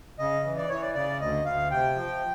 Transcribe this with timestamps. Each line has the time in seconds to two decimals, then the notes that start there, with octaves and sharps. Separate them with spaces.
0.19 C#3 D#5
0.44 E3
0.57 D5
0.69 E3 C#5
0.82 D5
0.95 C#3 D5
1.20 D2 D#5
1.45 D2 F5
1.71 C3 G5
1.96 F3